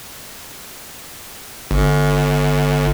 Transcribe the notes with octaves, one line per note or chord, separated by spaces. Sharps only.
G1